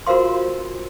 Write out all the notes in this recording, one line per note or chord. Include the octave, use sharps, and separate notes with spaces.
F4 F#4 A#4 C5 F5 C6